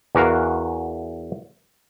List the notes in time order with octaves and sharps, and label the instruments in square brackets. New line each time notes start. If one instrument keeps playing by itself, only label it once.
[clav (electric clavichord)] E2 E3 F#4 A#4 F5